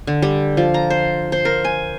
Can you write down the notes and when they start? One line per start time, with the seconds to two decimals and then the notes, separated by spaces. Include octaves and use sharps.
0.07 D3
0.22 G3
0.57 F3
0.74 A#5
0.90 C5
1.32 C5
1.45 A#4
1.64 G#5